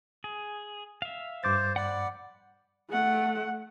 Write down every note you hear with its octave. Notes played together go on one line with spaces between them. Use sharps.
G#4
E5 F5
G2 C5 D6 A6
D5 F#5 B5 F#6
A3 F#5